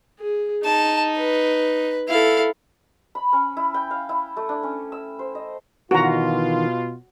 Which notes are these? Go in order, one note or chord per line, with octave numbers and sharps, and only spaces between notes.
G#4
D#4 A5
B4
E4 A4 F5
B5
C#4
E4
G5
F5
E4
A3
D4
C#4
E6
C5
D#5
B2 D#3 E3 F4 F#4 A#5